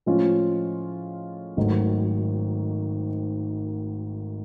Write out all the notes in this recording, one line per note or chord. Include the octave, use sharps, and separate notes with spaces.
A2 F3 G#3 C#4 F4
G#1 G#2 D#3 F#3 A3